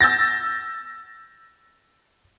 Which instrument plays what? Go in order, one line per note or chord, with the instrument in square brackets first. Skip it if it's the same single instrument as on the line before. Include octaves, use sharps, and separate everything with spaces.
[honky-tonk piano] E6 G6 A6 A#6